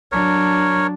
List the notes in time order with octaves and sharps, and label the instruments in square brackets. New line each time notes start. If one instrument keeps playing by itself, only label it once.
[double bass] F#3 D4 [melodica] A#4 C#5